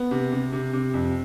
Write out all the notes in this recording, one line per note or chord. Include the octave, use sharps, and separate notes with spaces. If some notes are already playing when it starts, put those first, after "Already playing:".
Already playing: B3
C3
C3
C3
C3
F2